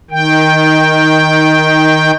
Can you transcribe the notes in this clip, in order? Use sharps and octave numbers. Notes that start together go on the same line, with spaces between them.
D#3 G5